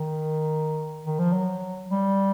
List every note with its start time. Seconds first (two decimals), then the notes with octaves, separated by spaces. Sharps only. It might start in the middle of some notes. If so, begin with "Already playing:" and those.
Already playing: D#3
1.05 D#3
1.19 F3
1.33 F#3
1.90 G3